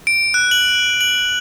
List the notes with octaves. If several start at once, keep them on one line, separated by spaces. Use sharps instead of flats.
D7
F#6
F#7
F#7